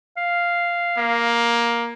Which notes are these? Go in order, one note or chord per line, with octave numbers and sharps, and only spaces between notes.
F5
A#3